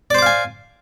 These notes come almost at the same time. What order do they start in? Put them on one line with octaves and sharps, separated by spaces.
D5 C5 D6 F5 G#5